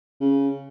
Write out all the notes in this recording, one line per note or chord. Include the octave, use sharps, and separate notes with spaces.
C#3